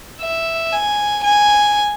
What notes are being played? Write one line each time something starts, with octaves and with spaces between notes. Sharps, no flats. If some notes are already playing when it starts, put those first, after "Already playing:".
E5
G#5
G#5